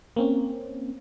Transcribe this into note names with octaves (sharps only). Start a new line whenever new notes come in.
A#3 C4 C#4